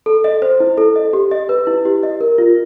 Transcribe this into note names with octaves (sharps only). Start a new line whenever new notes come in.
A4
D#5
C5
E4
A4
D#5
G4
D#5
B4
E4
G4
D#5
A#4
F4